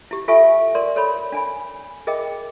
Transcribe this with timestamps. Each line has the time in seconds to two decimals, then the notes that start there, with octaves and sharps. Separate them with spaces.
0.11 E4 G4
0.28 F4 A4 E5 G#5 C#6
0.75 A#4 D5 C6
0.96 A4 C#5 B5
1.32 D4 G#5 B5
2.07 G#4 A#4 D#5 G5